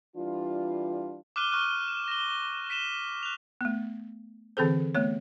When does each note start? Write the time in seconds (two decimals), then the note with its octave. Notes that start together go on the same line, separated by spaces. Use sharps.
0.16 E3 G3 D4 F4
1.36 D6 F6 F#6 D#7 G7
1.52 C#6 F6 F#6 D#7
1.88 E7
2.08 A#6 G7
2.70 B6 D#7 E7 G7
3.23 F#6 F7
3.61 A3 B3
4.57 D3 E3 C4 G#4 A4 C5
4.95 A3 B3 C#5